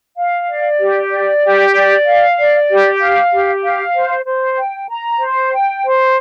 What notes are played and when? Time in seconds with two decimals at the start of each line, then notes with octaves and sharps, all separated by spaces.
0.17 F5
0.49 D5
0.80 G4
1.12 D5
1.43 G4
1.74 D5
2.06 F5
2.38 D5
2.69 G4
3.00 F5
3.32 G4
3.63 F5
3.95 C5
4.25 C5
4.57 G5
4.89 A#5
5.20 C5
5.52 G5
5.84 C5